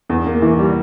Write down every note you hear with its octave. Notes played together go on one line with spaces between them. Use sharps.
E2
A#3
E3
G3